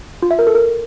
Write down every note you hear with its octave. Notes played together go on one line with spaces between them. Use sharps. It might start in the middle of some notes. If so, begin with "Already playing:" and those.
F4
E5
A#4
A4
A#4